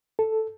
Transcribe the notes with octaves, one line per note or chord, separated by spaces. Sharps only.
A4